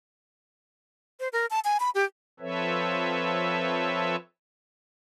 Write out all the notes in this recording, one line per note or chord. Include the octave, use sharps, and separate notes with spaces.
C5
A#4
A5
G#5
B5
G4
F3 C4 A4 B4 C#5 E5